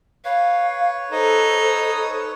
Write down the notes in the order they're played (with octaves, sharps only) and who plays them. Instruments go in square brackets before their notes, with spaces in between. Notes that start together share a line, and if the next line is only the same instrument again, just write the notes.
[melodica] B4 C#5 [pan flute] F5
[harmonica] D#4 [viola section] A4 [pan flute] C5